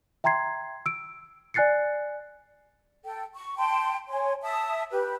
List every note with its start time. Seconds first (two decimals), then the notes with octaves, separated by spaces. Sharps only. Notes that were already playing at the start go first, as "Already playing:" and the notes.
0.24 E5 G5 A#5 C6 G#6 C7
0.86 E6 D7
1.54 D5 G#5 F#6 A6 C7 C#7
3.04 A4 G5
3.34 C#6
3.57 G5 A5 C6
4.09 C#5 G#5 C6
4.43 E5 A5 D#6
4.91 G4 B4